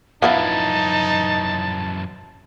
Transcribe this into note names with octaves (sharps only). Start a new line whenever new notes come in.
F#2 E3 F3 B3 D#4 E4 A5